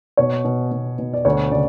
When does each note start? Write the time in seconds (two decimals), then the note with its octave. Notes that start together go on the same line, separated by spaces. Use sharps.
0.17 B2 C#5
0.45 B2
0.72 B2
0.99 B2
1.14 D5
1.25 D2 C#5
1.52 C#3 D5